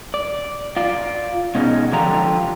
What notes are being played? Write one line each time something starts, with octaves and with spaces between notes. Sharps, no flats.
D5
F4 D5
B2 G#3 C#4 D#4
D3 F3 D4 F4 G4 A#5